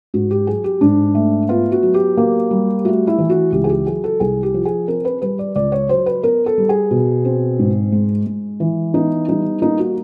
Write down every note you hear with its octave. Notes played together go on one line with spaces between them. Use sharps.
G#2 F#4
G4
F#3 G#4
G4
G#2 D4
A3
B3 F4
F#4
F#3
G4
A#3
G3
A3 F#4
E4
E3
F#4
C#2 G4
G#4
G4
F#3 G#4
A4
C2 G#4
G4
F3
G#4
C4 A#4
B4
G3 B4
D5
C#2 D5
C#5
F#3 C5
B4
B3 A#4
A4
G3
G#4
B2
C4
G#2
G#3
G#3
E3
B3 D#4
G3 D#4
A#3 D#4
F#4